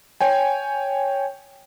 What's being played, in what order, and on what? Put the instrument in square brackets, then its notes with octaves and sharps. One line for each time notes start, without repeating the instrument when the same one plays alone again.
[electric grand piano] C#5 G5 G#5